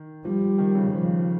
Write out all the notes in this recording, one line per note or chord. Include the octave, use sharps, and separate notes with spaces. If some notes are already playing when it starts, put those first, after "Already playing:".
Already playing: D#3
F3 G3
D#3
C#3
F3